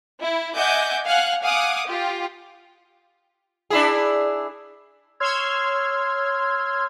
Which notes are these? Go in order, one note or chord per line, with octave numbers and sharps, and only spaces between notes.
E4
D#5 E5 F#5 G#5 D6 G6
F5 F#5 G#5 F#6
F5 F#5 G#5 D6 D#6
F4 G4
D4 E4 G#4
C#5 C6 E6 F6 G#6